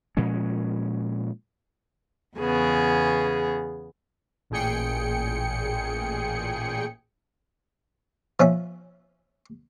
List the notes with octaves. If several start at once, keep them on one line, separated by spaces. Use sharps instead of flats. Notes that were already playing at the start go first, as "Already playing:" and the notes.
A#2 F3 G#3 C#4
E2 C#3 B3 G#4
A1 A#2 G#4 G5 C#7
F3 C#4 E5